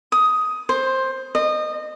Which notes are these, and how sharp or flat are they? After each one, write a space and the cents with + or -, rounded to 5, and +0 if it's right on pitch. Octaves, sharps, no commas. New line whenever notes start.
D#6 +10
C5 +10
D#5 -25